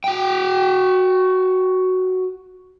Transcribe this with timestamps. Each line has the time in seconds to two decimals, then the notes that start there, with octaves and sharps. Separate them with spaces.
0.04 F#4 G5